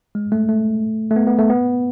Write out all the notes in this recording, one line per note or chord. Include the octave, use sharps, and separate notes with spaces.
G#3
A3
A3
A3
B3
B3
A3
B3